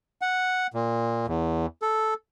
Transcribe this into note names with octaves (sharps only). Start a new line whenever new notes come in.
F#5
A#2
E2
A4